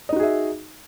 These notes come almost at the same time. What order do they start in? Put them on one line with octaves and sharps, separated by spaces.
D#5 D#4 F#4 G#4 E5